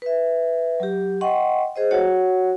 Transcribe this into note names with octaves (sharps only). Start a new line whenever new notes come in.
B4 E5
F#3 G4
D#5 F#5 G5 C6 C#6
G#4 C5 D#5
F#4 C#5 F#5